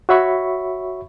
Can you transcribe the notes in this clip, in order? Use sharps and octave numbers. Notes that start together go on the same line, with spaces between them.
F#4 C#5 E5 B5 C#6